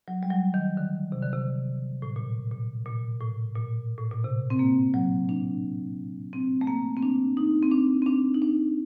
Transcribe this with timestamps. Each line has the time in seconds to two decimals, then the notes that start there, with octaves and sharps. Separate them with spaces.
0.08 F#3
0.23 G3
0.31 F#3
0.54 D#3
0.77 D3
1.12 C3
1.23 D3
1.33 C3
2.02 A2
2.16 A#2
2.51 A#2
2.86 A#2
3.20 A2
3.55 A#2
3.98 A2
4.11 A#2
4.24 C3
4.50 C4
4.59 A#3
4.94 F#3
5.29 D4
6.33 C4
6.61 A3
6.67 A#3
6.97 C4
7.03 D4
7.37 D#4
7.63 C4
7.71 D4
8.02 C4
8.06 D4
8.34 D#4
8.42 D4